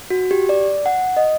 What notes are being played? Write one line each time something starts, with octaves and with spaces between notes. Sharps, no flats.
F#4
G4
D5
F#5
D#5